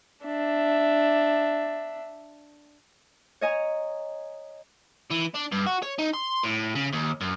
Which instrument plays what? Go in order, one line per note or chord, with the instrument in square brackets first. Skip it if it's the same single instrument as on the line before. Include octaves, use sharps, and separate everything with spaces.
[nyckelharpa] D4 E5
[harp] C#5 D#5 G#5 A#5
[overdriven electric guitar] E3
D4
G2
F#4
C#5
D#4
C6
A2
C#3
D#2
F#2